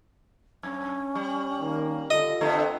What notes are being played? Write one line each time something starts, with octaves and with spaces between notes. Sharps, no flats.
F#2 C#4
G3
D#3 A#3
D3 F4 A4 D#5
D3 A3 B3 C4